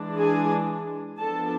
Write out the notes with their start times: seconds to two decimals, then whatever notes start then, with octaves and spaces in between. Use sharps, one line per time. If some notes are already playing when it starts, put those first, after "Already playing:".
Already playing: E3 G#3 D4
0.18 G#4 G#5
1.20 F3 B3 D4 A4 A5